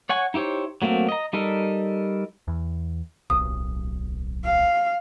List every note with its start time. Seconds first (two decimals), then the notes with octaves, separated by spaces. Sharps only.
0.09 C#5 F#5 G#5 C#6
0.34 D#4 E4 G4 C5 C#5
0.82 F#3 A3 A#3 C4 F#4
1.09 D#5 A#5
1.33 G3 D#4 A4 A#4
2.48 E2
3.30 D1 B1 D#6
4.46 F5